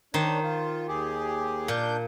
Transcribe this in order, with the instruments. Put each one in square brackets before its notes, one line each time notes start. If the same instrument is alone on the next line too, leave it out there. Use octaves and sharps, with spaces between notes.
[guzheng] D#3 C5 [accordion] D4 C#5
[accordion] F4
D#2 G4 G#4
[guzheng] A#2 [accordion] D4 G6